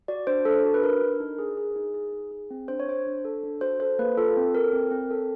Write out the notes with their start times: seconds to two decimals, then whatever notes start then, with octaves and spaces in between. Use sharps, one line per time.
0.08 F#4 D5
0.27 D4 C5
0.45 D4 A4
0.65 F#4
0.74 B4
0.83 D4 A#4
1.02 D4
1.20 D#4
1.39 G#4
1.57 G#4
1.76 D#4
1.94 G#4
2.12 D#4
2.31 G#4
2.51 C4
2.68 D4 C5
2.80 C#5
2.87 D4 C5
3.07 D4
3.25 A4
3.44 D4
3.61 F#4 C5
3.80 A4 C5
3.99 A#3 B4
4.17 F4 A4
4.37 C4
4.55 A4 A#4
4.73 C4
4.91 C4
5.11 A4